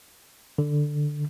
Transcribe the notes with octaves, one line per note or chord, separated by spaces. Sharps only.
D3